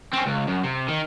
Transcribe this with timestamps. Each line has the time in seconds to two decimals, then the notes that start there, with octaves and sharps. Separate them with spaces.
0.13 C4 C#4
0.26 C#2
0.47 F#2
0.64 C3
0.88 D#3